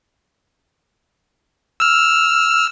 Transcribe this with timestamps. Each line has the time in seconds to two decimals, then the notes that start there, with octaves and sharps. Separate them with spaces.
1.80 E6 F6